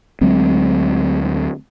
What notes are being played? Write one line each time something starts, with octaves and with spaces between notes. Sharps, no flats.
D2 F#3 G#3 C4